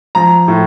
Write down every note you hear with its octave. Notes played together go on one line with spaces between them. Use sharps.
F3 A#5
A2